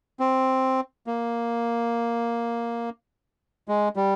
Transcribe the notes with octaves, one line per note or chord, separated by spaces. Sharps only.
C4
A#3
G#3
G3